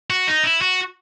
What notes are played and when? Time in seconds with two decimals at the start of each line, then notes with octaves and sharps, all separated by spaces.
0.10 F#4
0.27 D#4
0.43 E4
0.62 F#4